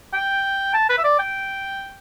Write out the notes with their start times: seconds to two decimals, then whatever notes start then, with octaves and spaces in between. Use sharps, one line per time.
0.13 G5
0.74 A5
0.89 B4
0.98 E5
1.04 D5
1.19 G5